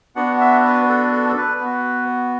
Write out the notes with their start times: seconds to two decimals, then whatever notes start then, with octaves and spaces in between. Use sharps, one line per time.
0.16 B3 D4 F#4 F#5
0.40 E5
0.65 B4
0.89 A4
1.12 A4
1.29 A4
1.37 B4
1.61 B3 F#4